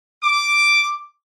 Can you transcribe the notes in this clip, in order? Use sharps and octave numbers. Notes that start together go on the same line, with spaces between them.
D6